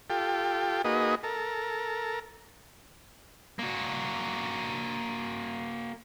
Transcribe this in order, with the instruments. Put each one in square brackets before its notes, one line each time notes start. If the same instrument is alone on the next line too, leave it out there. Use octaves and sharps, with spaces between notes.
[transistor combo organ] F4 G4 A4 G5
A#3 D#4 F#4 G#4 B4 D#5
A4 A#4
[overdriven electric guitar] A#3 F#4